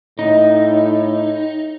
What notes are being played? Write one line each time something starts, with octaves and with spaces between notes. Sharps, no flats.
A2 D#4